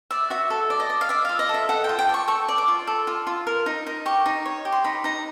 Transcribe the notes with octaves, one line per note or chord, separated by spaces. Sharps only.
D5 E5
F#4 E5
A4
D5
D#5
D5
F5
D5 E5
F4 F5
D#5
A4
E5
A4 F#5
G5
F4
G5
D5
C#6
A4 C#6
D5
D6
F4
A4
F4
F4
A#4
D#4
D#4
G4 C#6
D#4
C#5
G4
C6
D#4 B5
D#4 A#5